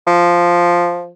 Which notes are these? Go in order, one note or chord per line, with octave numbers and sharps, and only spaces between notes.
F3